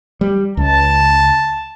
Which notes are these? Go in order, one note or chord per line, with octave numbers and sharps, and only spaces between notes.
G3
C#2 A5